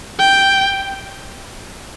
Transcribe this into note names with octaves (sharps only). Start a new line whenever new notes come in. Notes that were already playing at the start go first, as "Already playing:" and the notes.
G5